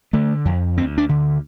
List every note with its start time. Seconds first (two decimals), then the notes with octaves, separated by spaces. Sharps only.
0.13 D3 A3
0.45 F2
0.77 D2 C4
0.98 D4
1.09 D3